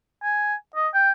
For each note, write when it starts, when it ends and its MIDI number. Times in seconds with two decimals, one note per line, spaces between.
0.23 0.55 80
0.76 0.88 75
0.94 1.11 79